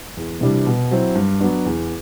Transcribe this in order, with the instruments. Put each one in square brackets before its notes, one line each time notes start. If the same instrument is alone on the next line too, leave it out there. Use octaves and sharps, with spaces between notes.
[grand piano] E2
C3 E3 G3 D4
B2
F#3 C4 E4
G2
F#3 B3 D4
E2